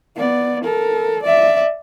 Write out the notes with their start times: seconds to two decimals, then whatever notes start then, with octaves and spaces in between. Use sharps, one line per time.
0.16 B3 D5
0.64 A4 A#4
1.23 D5 E5